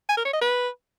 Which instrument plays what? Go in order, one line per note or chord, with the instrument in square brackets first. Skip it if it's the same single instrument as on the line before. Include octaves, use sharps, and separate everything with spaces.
[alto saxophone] G#5
A#4
C#5
D#5
B4